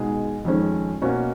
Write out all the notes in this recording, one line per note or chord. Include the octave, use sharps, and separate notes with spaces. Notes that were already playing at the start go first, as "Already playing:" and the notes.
Already playing: B2 G#3 D#4 G#4
F2 D#3 G#3 C#4
B2 A#3 C#4 F#4